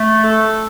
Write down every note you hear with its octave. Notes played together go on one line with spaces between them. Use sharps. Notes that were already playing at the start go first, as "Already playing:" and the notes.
Already playing: A3
A4